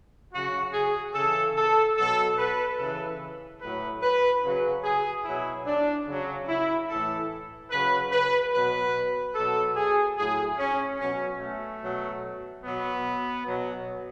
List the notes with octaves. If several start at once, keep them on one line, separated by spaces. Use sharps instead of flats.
C#3 F#3 F#4
G#4
C#3 E3 A4
A4
B2 F#3 A4
B4
C#3 E3 A4
A2 F#3 B4
B4
C#3 F#3
G#4
B2 F#3 E4
D4
C#3 F#3
E4
A2 E3 A4
C#3 F#3 B4
B4
B2 F#3 B4
B2 F#3 A4
G#4
A2 F#3 G#4
C#4
B2 F#3 C#4
A3
B2 F#3
B2 F#3 B3
B2 F#3